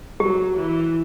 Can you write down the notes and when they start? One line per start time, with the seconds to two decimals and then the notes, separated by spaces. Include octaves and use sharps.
0.20 F#3 G4
0.56 E3